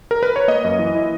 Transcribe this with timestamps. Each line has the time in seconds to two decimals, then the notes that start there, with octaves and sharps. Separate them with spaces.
0.11 A#4
0.23 B4
0.36 C#5
0.48 A#3 D#5
0.64 F#2
0.79 E3
0.95 E4